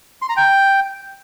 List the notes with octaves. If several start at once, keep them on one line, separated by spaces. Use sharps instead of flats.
C6
A#5
G5